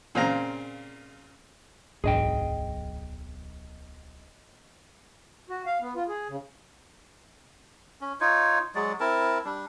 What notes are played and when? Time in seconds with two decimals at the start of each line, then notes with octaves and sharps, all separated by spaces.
0.15 A#2 C#3 C4 F5 A#5
2.04 D1 B1 G#2 D4 G#4 D#5 G5
5.49 F#4
5.66 F5
5.81 B3
5.95 F4
6.08 G#4
6.29 C#3
8.01 C#4
8.21 D#4 F4 C#5
8.75 F#3 G#3 D5
9.00 C4 E4 A#4 A5
9.45 G3 D4